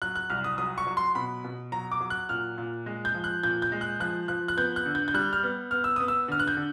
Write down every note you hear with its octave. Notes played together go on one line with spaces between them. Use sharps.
F#3 F#6
F#6
C2 F6
D#6
F#3 D#6
C#6
F#3
C6
B2 B5
B2
F#3 A#5
D6
F#3
F#6
A#2 F6
A#2
G#3
G6
F3
F#6
A#2 G6
G6
G#3
F#6
F3 F#6
F3 F#6
F#6
B3 G6
F#6
D3
G6
G6
G3 F#6
F6
B3
B3 F6
E6
B3 D#6
E6
D3 F6
F#6
G6
D3